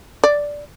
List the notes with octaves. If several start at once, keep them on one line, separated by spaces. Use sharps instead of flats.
D5